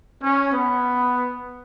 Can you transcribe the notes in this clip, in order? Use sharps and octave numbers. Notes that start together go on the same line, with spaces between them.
C#4
B3